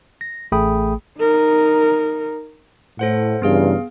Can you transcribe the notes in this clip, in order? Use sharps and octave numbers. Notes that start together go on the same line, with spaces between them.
A#6
A1 A3 G#4 G5 B5 D#6
D#4 A#4
A2 A4 C5 F#5
G2 C#3 E3 B3 G#4 F5